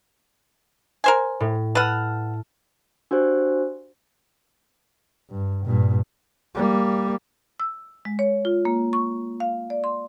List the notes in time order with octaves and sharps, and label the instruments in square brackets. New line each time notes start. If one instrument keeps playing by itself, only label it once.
[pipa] A#4 C5 G#5
[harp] A2
[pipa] B4 F#5 [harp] A5 E6 F6
[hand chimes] D4 F#4 G4 C5
[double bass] G2
G2 A#2
G3 A#3
[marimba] E6
G#3
C#5
F4
A#3
C#6
F5
D5
C6